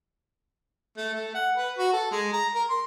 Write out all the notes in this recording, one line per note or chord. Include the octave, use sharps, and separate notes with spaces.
A3
A3
F#5
B4
F#4
A4
G#3
A#5
A#4
C6